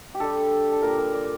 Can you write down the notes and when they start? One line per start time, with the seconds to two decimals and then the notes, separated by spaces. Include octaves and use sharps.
0.15 G4
0.20 D3 G3 A4
0.72 A4
0.82 A#2 G3 A#4
0.98 A#4
1.14 D5